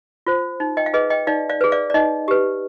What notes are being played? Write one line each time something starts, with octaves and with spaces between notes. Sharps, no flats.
F4 C5
D#4
D#5 G5
F5
G#4 B4 D#5
D#5 G5
D#4 D5 F5
D5 F5
G#4 B4
D5 F5
D5
D#4 D#5
G4 B4